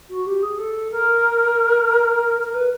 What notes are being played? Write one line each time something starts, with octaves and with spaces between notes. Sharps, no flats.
F#4
G4
G#4
A4
A#4
A#4
B4